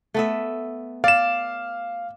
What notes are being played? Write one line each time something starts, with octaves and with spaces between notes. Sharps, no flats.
A3 B3 E5
D5 F5 E7